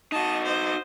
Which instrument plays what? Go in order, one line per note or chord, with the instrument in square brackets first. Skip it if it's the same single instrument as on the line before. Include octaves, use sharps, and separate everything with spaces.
[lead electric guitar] D#4 F#4 [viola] D#5 A5
[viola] C5 D#5